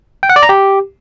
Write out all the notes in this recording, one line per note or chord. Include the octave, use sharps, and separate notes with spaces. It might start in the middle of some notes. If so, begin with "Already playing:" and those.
G5
F#5
D5
A#5
G4